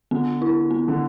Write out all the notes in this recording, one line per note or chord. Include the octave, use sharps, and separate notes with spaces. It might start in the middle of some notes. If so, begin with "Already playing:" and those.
D3 B3
E4
B3
D3